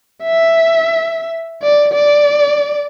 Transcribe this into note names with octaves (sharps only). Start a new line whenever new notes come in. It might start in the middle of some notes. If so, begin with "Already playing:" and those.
E5
D5
D5